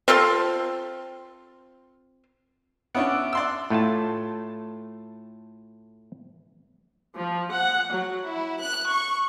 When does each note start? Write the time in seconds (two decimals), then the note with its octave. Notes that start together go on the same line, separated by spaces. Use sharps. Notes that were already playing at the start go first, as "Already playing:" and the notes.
0.08 C4 F4 A4 C6
2.95 B3 C#4 D4 E5 F#5 D6
3.33 D5 C6 E6
3.70 A2 A3 F4 A5
7.15 F3
7.52 F#5
7.92 F#3
8.26 E4
8.61 F#6
8.90 C#6